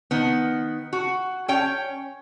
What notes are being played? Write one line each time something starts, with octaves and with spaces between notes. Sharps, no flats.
D#3 B3
F#4
C#4 C#5 G5